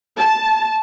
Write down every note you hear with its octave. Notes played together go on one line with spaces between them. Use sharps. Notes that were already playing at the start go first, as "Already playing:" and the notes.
A5